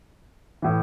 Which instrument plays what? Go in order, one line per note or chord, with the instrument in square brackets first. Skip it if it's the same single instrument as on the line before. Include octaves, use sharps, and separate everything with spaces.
[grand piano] A2 E3